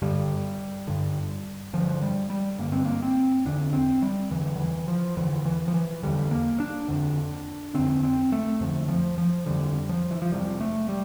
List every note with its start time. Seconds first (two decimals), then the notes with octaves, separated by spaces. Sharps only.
0.02 G2 D3 G3
0.87 G2 D3
1.73 G2 D3 F3
2.02 G3
2.30 G3
2.59 G2 D3 A#3
2.72 C4
2.85 A#3
3.02 C4
3.45 E2 D3 D4
3.73 C4
4.02 G3
4.31 E2 D3 E3
4.56 D3
4.59 E3
4.88 F3
5.17 E2 D3 E3
5.45 E3
5.68 F3
5.74 E3
6.03 E2 D3 G3
6.31 A#3
6.60 D4
6.88 F2 D3
7.74 F2 D3 C4
8.03 C4
8.32 A3
8.61 F2 D3 F3
8.88 F3
9.18 F3
9.46 F2 D3 G3
9.89 F3
10.11 E3
10.22 F3
10.32 F2 C3 G3
10.61 A3
10.89 G3